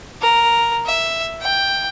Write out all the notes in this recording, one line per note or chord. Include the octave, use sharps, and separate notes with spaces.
A#4
E5
G5